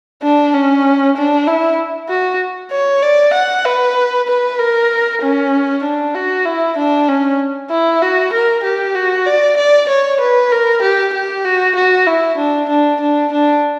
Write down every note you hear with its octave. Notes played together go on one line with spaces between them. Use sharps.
D4
C#4
D4
E4
F#4
C#5
D5
F#5
B4
B4
A#4
C#4
D4
F#4
E4
D4
C#4
E4
F#4
A#4
G4
F#4
D5
D5
C#5
B4
A#4
G4
G4
F#4
F#4
E4
D4
D4
D4
D4